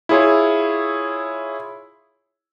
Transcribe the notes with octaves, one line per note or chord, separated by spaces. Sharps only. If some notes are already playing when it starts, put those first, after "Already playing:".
E4 F4 G#4 C#5